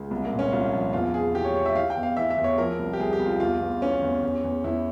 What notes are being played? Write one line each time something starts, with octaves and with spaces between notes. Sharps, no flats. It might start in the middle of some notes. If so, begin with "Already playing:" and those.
Already playing: C#2
C2
A#3
A#2
C#4
C2 F4
F3
E2 F4
E2 G#4
E3 G4
C#5
E3 C#5
E5
E3 F5
G5
E2
F5
E3 E5
E5
E2
C#5
F3 A#4
C2
G4
C2 G#4
G4
C2
F4
E2 F4
E2
E3 C#4
E2
E2
E2
E2 E4